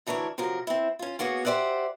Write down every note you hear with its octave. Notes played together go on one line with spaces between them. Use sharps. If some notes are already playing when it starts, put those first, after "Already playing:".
D2 E3 D4 A#4 C#5
C3 F3 F#3 A#4
C4 E4
C#4 F4
A#3 B3 F#4 G#4 C#5
G4 C5 D5 E5 F#5